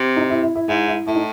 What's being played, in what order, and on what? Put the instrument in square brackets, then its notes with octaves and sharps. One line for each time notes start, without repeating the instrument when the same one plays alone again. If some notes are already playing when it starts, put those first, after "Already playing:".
Already playing: [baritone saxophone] C3
[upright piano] D#4
E4
E4
E4
[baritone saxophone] G#2 [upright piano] E4
[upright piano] E4
[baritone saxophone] A2 [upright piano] E4
[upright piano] D#4